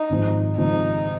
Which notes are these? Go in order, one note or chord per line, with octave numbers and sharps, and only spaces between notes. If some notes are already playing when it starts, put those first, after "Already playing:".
Already playing: D#4
G#1 G#2 F3
G#1 G#2 F3 D#4